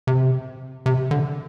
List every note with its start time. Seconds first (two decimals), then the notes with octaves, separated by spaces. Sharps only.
0.07 C3
0.86 C3
1.11 D3